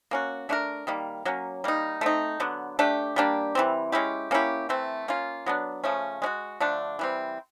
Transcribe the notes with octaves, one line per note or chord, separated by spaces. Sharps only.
A#3 C#4 F#4
A3 D4 G4 A#4
D#3 G3 A#3
F#3 A#3 C#4
G3 A#3 D#4
A3 C4 D#4
D3 F#3 B3
A3 D4 G4
G3 A#3 D4 G4
E3 G3 C4
G#3 C#4 E4 G4
A#3 C#4 E4 G4
E3 A3 C4
A#3 C#4 F4
F#3 B3 D4
C#3 F3 A3 C#4
G#3 C#4 F#4
D3 F3 A3 D4
E3 G3 C4